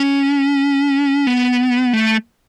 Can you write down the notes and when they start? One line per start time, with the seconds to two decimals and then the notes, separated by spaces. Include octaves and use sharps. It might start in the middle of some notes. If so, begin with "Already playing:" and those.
Already playing: C#4
1.27 B3
1.93 A3